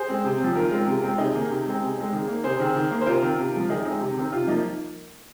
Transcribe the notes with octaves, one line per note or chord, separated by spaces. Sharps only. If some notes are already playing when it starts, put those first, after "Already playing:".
Already playing: G#4 C5
G#3 C4
C3
F3 C4
D#3 F4 A#4
G#3 C4
C3
G#3 C4
C3 D#4 G#4
D#3 A#3
C3
G#3 C4
C3
G#3 C4
D#3
A#3
C3 G#4 C5
D#3 C4
D#3
A#3
C5
C3 F4 A#4
D#3 C4
C3
F3 G#3
D#3 D#4 G#4
G#3 C4 D#4
C3
D#3 C4
C3 F4
F3 A#3 D#4